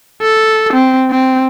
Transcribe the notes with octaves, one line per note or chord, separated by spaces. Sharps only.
A4
C4
C4